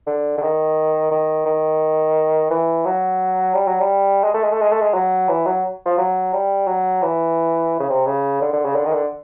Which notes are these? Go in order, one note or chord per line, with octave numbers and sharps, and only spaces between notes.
D3
D3
D#3
D#3
D#3
E3
F#3
G3
F#3
G3
G#3
A3
G#3
A3
G#3
A3
G#3
F#3
E3
F#3
F3
F#3
G3
F#3
E3
C#3
C3
C#3
D3
D3
C#3
D3
D#3
D3